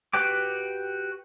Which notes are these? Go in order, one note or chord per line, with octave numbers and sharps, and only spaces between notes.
F#4 G4 B4 G5 D6